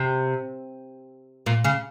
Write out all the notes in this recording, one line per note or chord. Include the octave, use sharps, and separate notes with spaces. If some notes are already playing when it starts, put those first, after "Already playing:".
Already playing: C3
A#2
C#3